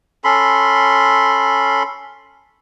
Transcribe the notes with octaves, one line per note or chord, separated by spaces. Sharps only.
C#4 A4 B5 C6